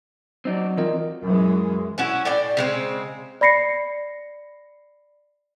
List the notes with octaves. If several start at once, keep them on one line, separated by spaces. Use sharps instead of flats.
F#3 C4 D#4 D5
E3 C4 F4 A#4 D#5
F#2 E3 G#3
C#4 E4 F#4
A2 D5 G5
C#3 G#3 C4
D5 B5 A#6 C7 C#7